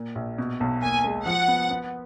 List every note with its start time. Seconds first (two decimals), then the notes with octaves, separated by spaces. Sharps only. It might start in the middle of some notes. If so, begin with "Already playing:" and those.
Already playing: A#2
0.15 A#1
0.38 B2
0.60 B1
0.82 D#2 G#5
1.04 G#3
1.26 F3 F#5
1.48 B3
1.70 B3